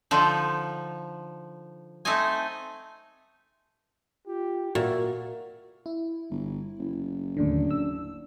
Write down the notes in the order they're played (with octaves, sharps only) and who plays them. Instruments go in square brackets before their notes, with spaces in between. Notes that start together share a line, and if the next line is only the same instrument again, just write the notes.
[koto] D3 F3 D#4
A3 C4 D#4 D#5 G#5
[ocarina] F4 [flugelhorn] G4
[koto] A#2 [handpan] F#4 [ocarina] A#4 [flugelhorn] E5
[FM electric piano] E4
[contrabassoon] G1
F#1
[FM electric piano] D#2 A2 D3 [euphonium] D4
[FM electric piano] E6